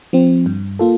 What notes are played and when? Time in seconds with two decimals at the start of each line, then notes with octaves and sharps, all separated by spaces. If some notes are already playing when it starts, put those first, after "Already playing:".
0.13 F3 C4
0.46 G2
0.79 A#3 F4 A4